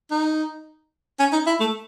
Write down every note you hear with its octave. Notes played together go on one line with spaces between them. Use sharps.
D#4
C#4
D#4
E4
A3